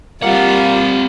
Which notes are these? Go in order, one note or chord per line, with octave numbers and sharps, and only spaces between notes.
G3 A#3 C4 F4 F#5